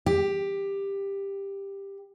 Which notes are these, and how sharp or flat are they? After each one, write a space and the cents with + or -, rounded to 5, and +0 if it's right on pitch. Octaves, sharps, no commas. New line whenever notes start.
G4 +10